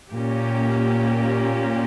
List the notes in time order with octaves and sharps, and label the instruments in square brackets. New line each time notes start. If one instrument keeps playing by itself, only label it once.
[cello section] A#2 A#3 C#4 G4